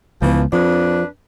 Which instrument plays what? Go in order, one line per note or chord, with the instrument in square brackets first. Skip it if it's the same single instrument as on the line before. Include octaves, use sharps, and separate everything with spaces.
[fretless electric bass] C#2 B3 [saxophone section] E3 F3
[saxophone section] F2 D4 B4 [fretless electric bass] F3